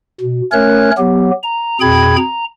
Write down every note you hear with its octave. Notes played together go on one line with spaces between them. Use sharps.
B2
A3 C#4 A#4 C#5 F#6
F#3 B3 G4
A#5
F2 B2 G#4 G5 B5 G#6
A#5